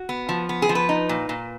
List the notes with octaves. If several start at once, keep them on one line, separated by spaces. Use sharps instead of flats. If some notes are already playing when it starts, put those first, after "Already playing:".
Already playing: F#4
B3
F3
B3
G#4
F3
B4
D#4
A#2
A#2